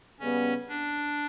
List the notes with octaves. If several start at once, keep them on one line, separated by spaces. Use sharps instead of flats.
C#3 G3 B3 C#4
D4